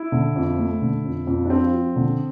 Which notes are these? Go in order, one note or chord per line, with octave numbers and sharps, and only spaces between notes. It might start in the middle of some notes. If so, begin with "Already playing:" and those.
Already playing: E4
D3
F2
A3
D3
F2
F2
D4
F3 C4
F3
D3